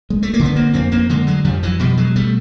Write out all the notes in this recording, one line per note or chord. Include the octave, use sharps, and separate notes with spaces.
G#3
A3
A#3
D3
B3
A#3 C4
F2 A#3 C4
A#3 C4
D3 G#3 A#3
F#3 G#3
F2 F3 G3
E3 F#3
B2 F3 G3
F#3 G#3
G3 A3